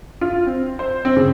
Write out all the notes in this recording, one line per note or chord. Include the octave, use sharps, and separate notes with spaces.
F4
C4
C5
C4
C#3